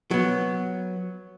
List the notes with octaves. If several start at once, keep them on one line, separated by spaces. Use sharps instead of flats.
F#3 B3